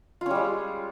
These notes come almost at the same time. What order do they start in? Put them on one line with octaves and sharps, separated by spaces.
F4 C#4 G3 G#3